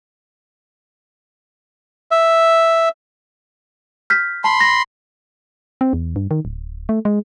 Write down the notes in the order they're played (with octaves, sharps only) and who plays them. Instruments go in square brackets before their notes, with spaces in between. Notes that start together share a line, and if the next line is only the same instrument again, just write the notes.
[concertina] E5
[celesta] F6 G6 B6
[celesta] A5 [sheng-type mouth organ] B5 C6
[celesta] A#6
[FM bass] C4
E2
G2
D#3
D1
A3
G#3